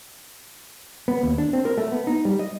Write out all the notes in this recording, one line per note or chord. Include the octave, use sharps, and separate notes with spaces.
B3
D#2
D4
C4
A#4
A3
B3
D#4
G3
D#5